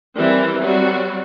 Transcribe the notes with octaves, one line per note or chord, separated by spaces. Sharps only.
E3 G3 C4 A#4
F#3 G3 C4 F#4